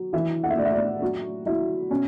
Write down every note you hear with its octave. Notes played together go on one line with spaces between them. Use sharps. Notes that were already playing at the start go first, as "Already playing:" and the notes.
Already playing: F#3
E3 E5
F#5
E5
A2 D5
E5
D5
F#3 F#4
F#3 E4
B2 C#4